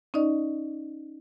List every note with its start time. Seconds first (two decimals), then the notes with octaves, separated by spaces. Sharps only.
0.14 C#4 D#4 D5 D#5